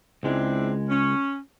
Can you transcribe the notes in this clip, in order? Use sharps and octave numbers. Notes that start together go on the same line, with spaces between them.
C#2 G#3 C4 D4 E4
C#4